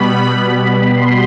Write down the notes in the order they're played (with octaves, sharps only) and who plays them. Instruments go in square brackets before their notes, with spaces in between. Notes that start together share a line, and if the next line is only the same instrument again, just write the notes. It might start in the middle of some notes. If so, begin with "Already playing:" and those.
Already playing: [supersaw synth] B2 G3 B3 B5
C6